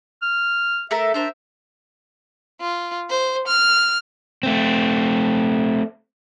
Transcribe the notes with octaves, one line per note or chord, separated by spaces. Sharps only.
F6
A3 A4 A#4 E5
D4 A#4 C5 E5
F4
C5
F6
A3 C4